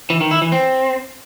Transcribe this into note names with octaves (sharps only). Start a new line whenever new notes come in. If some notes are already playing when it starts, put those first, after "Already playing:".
E3
D#3
E4
E3
C4